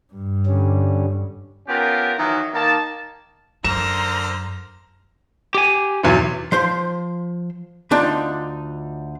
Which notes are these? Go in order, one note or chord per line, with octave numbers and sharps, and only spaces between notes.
G2
D3 G3 C#4
B3 C#4 F4 G4 A#4
D#3 E3 F#3
D#3 A#3 A5
F#2 D3 A#4 C5 A#5 E7
G4 G#5
B1 E2 F#3
F3 C5 C6
D2 D4 D#4 F4